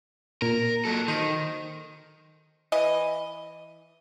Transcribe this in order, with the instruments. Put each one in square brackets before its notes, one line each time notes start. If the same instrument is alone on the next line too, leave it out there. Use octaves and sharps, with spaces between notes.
[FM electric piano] A#2 [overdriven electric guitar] A#4
[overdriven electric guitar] F#3 A4
[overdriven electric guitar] D#3 [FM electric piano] C5 D#5 D#6
[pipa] E3 D#5